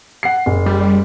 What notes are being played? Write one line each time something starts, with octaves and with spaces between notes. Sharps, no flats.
F#5 C7
F#1
G3